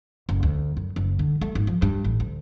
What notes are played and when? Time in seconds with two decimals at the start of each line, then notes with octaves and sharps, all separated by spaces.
0.29 F#1
0.43 D2
0.77 F#2
0.96 F#1
1.19 D3
1.41 A3
1.55 G#1
1.67 F3
1.82 G2
2.04 A1
2.20 D2